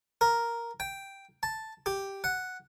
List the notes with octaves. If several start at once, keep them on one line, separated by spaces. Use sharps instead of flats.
A#4
G5
A5
G4
F#5